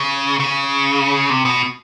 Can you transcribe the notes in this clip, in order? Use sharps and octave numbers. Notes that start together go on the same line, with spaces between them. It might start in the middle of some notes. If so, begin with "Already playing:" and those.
Already playing: C#3
C#3
C3
B2